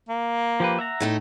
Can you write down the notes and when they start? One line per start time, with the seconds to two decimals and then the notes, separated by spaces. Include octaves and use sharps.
0.09 A#3
0.60 F3 G4 B4
0.79 E5 F#5 A#5
1.00 A2 A3 D#4